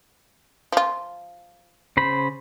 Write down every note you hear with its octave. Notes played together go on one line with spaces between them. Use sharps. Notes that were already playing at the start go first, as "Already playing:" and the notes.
F3 F4
C#3 C5 B5